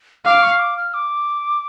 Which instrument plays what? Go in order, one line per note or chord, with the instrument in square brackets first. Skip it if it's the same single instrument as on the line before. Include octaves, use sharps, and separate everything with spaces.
[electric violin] F5 [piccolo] D6
[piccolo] C#6
D6
F6
D6